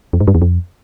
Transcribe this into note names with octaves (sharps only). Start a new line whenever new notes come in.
F2
G#2
G2
E2
F2